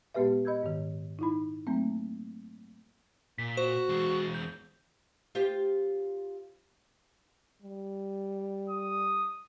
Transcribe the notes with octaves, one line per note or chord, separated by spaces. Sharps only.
A#2 G#3 B3 G4 B4 E5
D#5 B5 E6 G6 G#6
G#2 D#3
D#4 E4 B5
F#3 A3 A#3 C4
A#2 B6
F#4 C5
E2 G#3
G6
F4 G4 C5
G3
D#6